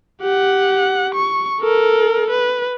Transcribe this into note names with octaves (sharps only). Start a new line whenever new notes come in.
G4 F#5
C#6
A4 A#4
B4